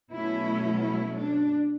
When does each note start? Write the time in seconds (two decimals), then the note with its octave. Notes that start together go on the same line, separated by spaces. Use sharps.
0.11 B2 F#3 A3 C#4 E4
0.82 E4
1.17 D4